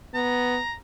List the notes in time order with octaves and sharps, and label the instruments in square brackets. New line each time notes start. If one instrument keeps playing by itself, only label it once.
[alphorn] B3 [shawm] A#5